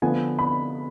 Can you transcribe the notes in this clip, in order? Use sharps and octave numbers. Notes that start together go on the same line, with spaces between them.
D3 F3 B3 F4 G#5
B5